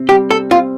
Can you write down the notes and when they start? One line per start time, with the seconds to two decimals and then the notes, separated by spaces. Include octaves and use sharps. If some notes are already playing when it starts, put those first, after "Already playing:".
Already playing: C3 C4
0.09 G3 G4
0.31 A4
0.51 C4 F4